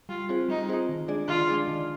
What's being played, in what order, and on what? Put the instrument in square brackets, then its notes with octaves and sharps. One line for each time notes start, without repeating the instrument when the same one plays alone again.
[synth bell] G3 [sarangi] F4
[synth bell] C4 F4 G#4 C5
[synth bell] G3 [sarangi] D#4
[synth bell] C4 F4 G#4 C5
D#3
G#3 D4 G#4 D5
[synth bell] D#3 [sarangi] F4
[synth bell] G#3 D4 G#4 D5
D#3